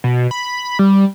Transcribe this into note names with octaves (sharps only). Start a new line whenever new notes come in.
B2
B5
G3